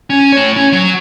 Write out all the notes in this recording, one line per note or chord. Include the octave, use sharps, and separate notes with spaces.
C#4
A3 C#5
C#4
F#3